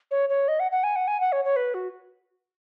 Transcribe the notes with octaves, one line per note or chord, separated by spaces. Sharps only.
C#5
C#5
D#5
F#5
F#5
G#5
F#5
G#5
F#5
C#5
C#5
B4
F#4